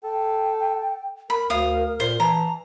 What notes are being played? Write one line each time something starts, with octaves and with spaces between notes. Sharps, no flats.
A4 G5
A#4 B5
D2 F5 D#6
A#2 C5
E3 A5 A#5